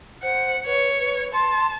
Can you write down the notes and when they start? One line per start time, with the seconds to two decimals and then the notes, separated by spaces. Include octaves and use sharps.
0.23 C5 F#5
0.66 B4 C#5
1.00 B4
1.33 A5 C6